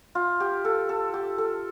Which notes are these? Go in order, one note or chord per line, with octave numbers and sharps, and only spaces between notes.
F4
G4
A4
A4
G4
A4